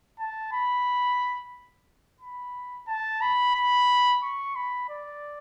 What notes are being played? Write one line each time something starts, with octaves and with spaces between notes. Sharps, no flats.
A5
B5
B5
A5
B5
B5
C#6
B5
D5